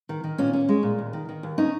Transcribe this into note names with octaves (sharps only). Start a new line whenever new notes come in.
D#3
D#3
A#2 C#4
C#4
G#3
A#2
D#2
D#3
D#3
D#2
C#4 D#4